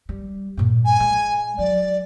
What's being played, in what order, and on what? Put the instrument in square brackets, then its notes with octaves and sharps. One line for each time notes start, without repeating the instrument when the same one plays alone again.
[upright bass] G3
G2 A#2
[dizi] G#5
[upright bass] G#3
[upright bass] F#3 [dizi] D5